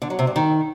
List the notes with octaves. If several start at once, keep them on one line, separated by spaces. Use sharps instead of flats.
D3
F#3
C3
G2
D#3